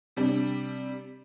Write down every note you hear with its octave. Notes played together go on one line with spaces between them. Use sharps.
C3 G3 D4